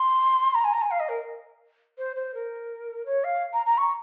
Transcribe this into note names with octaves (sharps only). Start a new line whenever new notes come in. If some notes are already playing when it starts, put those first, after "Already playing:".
Already playing: C6
A#5
G#5
A#5
G#5
F5
D#5
A#4
C5
C5
A#4
C#5
F5
A#5
A#5
C#6